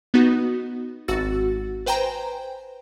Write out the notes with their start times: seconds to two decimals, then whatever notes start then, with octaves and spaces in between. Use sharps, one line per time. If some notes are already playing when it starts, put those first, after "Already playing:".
0.14 B3 D#4 F#4
1.08 G#1 F#4 E6 A6
1.86 B4 C5 G5 G#5 A#5